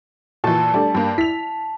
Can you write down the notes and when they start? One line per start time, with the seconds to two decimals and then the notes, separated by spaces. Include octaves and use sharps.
0.44 A#2 E3 F#4 A5 C#6
0.74 G3 A3 D4 D5
0.94 G2 A#3
1.18 E4 B6 F7